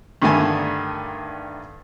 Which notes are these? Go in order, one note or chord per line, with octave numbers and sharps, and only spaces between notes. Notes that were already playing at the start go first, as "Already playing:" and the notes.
G2 D3 D#3 A3 G#5 A5